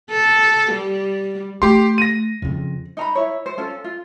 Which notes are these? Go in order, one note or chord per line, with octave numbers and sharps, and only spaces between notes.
A4
G3
A3 G4 C6
A#6 D#7
F2 C#3
D#4 A#5 B5
E4 C#5
C5
C#4 F4 A4
F4